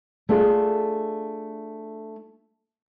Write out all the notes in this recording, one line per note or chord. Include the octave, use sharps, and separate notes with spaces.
A3 D4 F4 G#4